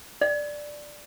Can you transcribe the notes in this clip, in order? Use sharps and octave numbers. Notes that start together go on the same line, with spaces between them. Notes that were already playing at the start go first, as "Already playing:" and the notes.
D5